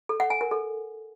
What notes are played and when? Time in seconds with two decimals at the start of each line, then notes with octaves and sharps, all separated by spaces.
0.09 A4
0.20 F#5
0.30 G#5
0.41 A#4
0.51 A4